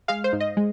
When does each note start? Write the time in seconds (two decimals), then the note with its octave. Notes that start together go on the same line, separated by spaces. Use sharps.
0.08 G#3 F5
0.24 C5
0.33 G#2
0.40 D#5
0.57 G#3